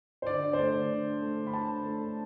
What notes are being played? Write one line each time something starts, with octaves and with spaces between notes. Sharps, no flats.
C5
D3 D5
D3
C5
A3 D5
D3
D3
D4
A3
D3
B5
D4 A5
D3
A3
D4